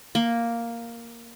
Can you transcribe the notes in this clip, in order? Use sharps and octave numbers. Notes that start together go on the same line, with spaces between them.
A#3